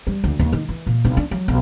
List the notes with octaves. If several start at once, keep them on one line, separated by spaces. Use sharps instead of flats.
G3
D2
D#2
D#3
E3
A#2
B1
D4
F#3
B1